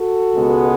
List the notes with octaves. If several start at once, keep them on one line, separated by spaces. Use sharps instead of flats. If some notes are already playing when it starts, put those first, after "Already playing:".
Already playing: F#4 A4
C#2 B2 G#3 B3